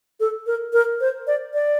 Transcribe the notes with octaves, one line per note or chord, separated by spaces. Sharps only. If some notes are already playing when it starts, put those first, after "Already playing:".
A4
A#4
A#4
C5
D5
D5